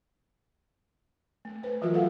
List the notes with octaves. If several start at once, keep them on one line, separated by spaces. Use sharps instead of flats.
A3
A3 B4 C5
E3 F#3 F4 F#4 A#4 E5
F4 F#4 A4 F5 F#5